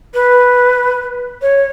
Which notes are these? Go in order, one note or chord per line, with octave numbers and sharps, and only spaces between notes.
B4
C#5